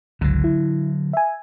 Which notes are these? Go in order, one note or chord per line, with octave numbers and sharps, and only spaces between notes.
G1 C#2 D3 F#3
E4
E5 G#5